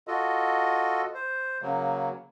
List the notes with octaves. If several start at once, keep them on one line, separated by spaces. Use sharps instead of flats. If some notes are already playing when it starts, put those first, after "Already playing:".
F4 F#4 A4 D#5
C5
C#3 F#3 A#3